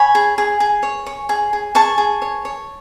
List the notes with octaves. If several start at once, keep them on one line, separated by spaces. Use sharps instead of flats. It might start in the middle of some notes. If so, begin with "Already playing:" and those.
Already playing: C#5 G#5 B5
G#4
G#4
G#4
C#5
C#5
G#4
G#4
G#4 A5 C#6
G#4
C#5
C#5